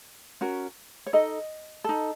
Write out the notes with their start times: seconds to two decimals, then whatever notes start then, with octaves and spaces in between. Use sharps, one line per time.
0.41 C#4 F#4 A#4
1.06 C#5
1.13 D#4 A4 D#5
1.84 D#4 A4